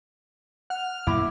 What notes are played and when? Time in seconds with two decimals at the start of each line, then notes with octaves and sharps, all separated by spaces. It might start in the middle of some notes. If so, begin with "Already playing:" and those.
0.70 F#5 F6
1.07 F#2 A#2 A#3 E4 D6